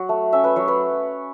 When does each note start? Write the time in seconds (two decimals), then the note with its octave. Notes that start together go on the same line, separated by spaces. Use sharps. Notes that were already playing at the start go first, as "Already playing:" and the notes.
Already playing: F#3 F#5
0.09 A3
0.33 C#4 E5
0.44 B4
0.56 F#3 C#5
0.68 B4